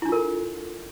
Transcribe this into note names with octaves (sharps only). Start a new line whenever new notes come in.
D4 E4 F4 A4 A#4